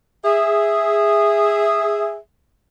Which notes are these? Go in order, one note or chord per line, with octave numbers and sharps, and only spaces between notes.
G#4 E5